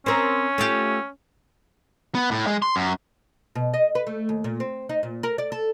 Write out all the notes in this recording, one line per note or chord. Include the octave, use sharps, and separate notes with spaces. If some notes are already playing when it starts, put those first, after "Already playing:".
C4 C#4 A#4
A3 F4 G4
B3
A2
G#3
C6
F#2
B2
D#5
B4
A3
D#2
A#2
C4
D#4
A#2
A#4
D5
A4